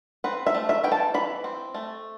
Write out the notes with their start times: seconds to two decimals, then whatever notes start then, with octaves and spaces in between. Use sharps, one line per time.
0.24 C4 B4
0.46 E5
0.54 A3
0.69 E5
0.84 E3 G5
0.92 A5
1.14 E3 B5
1.44 C4
1.74 A3